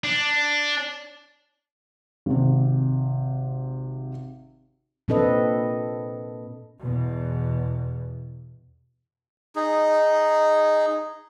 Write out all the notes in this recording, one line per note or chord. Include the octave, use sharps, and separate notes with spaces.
D4
G#1 C3
A#2 C4 D4 A4 B4 D#5
E2 B2
D#4 G#4